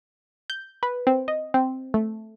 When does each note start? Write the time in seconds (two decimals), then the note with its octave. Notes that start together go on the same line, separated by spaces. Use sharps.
0.50 G6
0.83 B4
1.07 C4
1.28 D#5
1.54 C4
1.94 A3